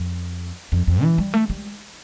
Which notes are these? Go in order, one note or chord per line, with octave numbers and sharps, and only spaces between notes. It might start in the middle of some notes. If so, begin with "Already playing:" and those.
Already playing: F2
F2
F2
E3
G3
A3
G3